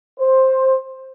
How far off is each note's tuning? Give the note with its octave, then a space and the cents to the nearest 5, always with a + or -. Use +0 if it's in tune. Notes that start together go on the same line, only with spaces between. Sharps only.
C5 +10